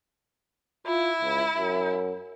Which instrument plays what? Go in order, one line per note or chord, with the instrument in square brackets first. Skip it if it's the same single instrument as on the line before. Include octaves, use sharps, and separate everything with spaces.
[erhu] E4 [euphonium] F4
[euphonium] C#2
F#2